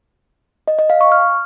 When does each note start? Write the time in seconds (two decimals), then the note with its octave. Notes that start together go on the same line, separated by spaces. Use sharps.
0.68 D#5
0.79 D#5
0.90 F5
1.01 C#6
1.12 F6